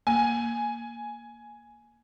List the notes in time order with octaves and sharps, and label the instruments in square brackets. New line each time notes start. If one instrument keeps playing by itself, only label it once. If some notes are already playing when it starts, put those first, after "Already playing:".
[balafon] A#3 [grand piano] G#5